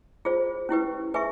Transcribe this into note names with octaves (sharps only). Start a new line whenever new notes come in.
F4 G#4 C5
C#4 E4 G4 B4
G#4 B4 E5 G#5 C#6